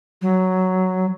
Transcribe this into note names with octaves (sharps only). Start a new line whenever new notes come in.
F#3